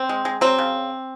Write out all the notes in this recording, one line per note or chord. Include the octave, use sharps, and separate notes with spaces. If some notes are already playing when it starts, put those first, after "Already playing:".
Already playing: C4
G#3
G#3
F#3 C4
C#3